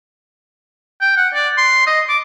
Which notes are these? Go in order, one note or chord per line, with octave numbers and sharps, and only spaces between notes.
G5
F#5
D5
C6
D#5
D6